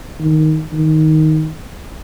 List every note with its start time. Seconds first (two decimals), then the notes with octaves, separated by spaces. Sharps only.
0.20 D#3
0.73 D#3